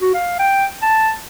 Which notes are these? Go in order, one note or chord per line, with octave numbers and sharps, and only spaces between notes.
F#4
F5
G5
A5